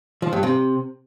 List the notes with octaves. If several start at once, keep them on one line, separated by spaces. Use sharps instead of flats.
F3
G2
C3